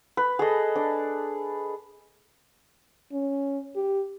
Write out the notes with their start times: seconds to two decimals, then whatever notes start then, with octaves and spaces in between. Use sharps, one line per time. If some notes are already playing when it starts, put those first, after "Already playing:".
0.17 B4
0.39 G#4 A4 D#5
0.76 D4
3.12 C#4
3.75 G4